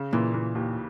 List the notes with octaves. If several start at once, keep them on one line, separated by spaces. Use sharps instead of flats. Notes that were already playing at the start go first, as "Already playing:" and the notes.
Already playing: C#3
A#2 E3
E3
D#2